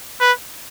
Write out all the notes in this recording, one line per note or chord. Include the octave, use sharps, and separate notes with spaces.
B4